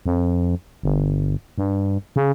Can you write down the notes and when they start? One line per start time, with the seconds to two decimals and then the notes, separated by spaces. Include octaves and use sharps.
0.06 F2
0.83 G1
1.58 G2
2.16 C#3